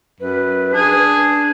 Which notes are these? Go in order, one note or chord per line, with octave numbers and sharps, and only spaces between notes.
F#2 B4
D4 G#4